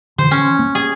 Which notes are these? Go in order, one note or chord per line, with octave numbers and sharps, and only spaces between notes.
D3 E3 C5
C#4
A#3
G#4